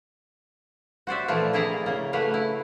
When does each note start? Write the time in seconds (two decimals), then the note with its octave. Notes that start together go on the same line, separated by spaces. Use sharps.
1.07 F#4 C5 D5 E5
1.28 A#2 E3 F3 A3 F4
1.53 C3 A#3 E4 G#4 D5 A#5
1.86 C#3 A#3
2.13 A3 A#3 F#4 B4 F5
2.34 E4